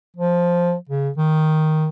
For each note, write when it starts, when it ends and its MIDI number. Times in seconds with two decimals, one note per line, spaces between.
0.17 0.75 53
0.89 1.09 49
1.17 1.88 51